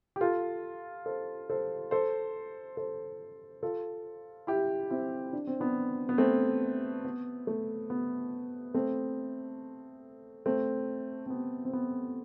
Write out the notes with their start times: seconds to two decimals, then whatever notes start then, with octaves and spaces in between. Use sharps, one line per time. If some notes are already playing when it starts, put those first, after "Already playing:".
0.16 G4
0.21 F4 A4
1.06 A4 C5
1.50 A4 C5
1.91 A4 C5
2.77 A4 C5
3.62 F4 A4
4.47 E4 G4
4.90 C4 E4
5.33 D4
5.47 C4
5.60 B3 D4
6.09 B3
6.18 A3 C4
7.05 B3
7.47 A3
7.90 B3
8.74 A3 C4
10.46 A3 C4
11.26 C4
11.30 B3
11.65 C4
11.73 B3